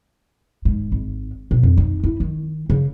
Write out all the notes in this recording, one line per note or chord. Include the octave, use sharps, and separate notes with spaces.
G#2
G#1
B2
F2
D#4
E4
D#3
C#3